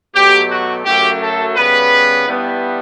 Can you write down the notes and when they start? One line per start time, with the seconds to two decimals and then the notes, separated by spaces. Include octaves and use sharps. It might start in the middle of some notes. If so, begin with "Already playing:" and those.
0.15 B2 F#3 A3 G4
0.49 F#4
0.85 F#2 C#3 F#3 A3 G4
1.21 A4
1.56 C#3 G3 B3 B4
2.26 G2 E3 G3 B3